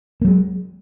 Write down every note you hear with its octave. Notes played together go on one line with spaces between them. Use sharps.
F#3 G#3 A#3